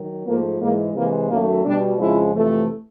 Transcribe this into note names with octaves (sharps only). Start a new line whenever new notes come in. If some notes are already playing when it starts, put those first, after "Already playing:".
Already playing: D#3 F#3
G#2 F3 A3 A#3
G#2 E3 G#3 A#3
C3 E3 G#3 A#3
F#2 D#3 F#3 A3 A#3
B2 G3 D4
F2 C#3 F3 G#3 E4
F2 C3 E3 A3